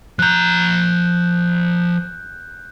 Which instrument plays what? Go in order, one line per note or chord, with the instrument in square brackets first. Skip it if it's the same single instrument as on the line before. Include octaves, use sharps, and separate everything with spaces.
[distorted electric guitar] F3 A#5 [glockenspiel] F#6 G6